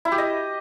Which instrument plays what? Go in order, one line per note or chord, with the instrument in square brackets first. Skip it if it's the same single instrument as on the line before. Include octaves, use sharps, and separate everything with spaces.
[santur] E4
G4
D#5